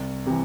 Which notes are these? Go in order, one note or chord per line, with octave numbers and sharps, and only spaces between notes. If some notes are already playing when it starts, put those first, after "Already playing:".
Already playing: C2
C3 E3